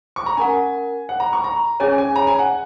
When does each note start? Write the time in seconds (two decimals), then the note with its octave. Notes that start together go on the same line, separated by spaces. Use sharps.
0.16 C#6
0.26 A#5
0.37 C#4 A#4 F#5 G#5
1.09 F#5
1.20 A#5
1.33 C#6
1.44 A#5
1.80 C#4 G#4 C#5 G#5
1.98 G#5
2.16 A#5
2.27 G#5
2.39 F#5